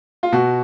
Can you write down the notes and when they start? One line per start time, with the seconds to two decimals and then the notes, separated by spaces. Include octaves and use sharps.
0.23 F4
0.32 B2 F#4